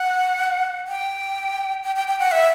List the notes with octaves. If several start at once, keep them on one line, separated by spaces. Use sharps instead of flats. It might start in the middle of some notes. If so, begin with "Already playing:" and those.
Already playing: F#5
G5
G5
G5
G5
F#5
E5